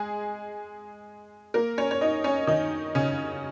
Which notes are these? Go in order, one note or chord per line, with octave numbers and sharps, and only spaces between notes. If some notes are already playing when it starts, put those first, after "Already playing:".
Already playing: G#3 G#4
A#3 A#4
C#4 C#5
C#5
D#4 D#5
C#4 C#5
D#3 D#4
C#3 C#4